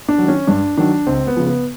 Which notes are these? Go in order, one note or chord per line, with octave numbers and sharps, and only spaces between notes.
D4
D#3 F#3
C#4
G2 D4
D#3 F#3 D4
C#2 C4
B3
C#3 F3
B3